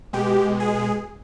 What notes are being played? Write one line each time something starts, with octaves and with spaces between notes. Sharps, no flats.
B2 G#3 G4
G#4